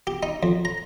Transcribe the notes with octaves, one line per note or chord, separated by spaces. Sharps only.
G4
D#4
F2
A#5